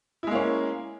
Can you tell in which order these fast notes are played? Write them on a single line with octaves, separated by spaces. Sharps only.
E4 G#3 A#3 C#4